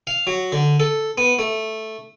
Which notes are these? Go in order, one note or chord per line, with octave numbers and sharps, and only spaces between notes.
F5
F#3
D3
A4
B3
A3